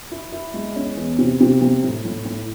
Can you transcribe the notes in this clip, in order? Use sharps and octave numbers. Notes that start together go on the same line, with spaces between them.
E4
E4
G#3
C#4
E2
C3
C3
C3
A2
A2
A2